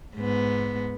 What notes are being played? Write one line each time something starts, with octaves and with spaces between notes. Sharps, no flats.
G#2 B3